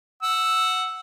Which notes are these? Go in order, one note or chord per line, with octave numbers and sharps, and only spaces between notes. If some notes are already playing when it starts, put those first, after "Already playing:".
F#5 E6